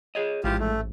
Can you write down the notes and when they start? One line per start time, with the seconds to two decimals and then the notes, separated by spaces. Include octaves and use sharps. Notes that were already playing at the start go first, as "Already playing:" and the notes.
0.15 G#4 C#5 D#5
0.44 A1 G#2 F3 G#3 E4 F4 G4
0.59 A3